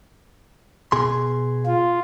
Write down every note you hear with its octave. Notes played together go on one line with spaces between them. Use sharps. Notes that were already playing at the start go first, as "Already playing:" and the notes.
B2 G#4 C6
F4